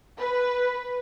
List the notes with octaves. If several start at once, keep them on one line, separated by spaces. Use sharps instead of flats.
B4